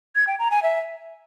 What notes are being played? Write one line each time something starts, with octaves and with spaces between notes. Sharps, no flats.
G#6
G5
A#5
G#5
E5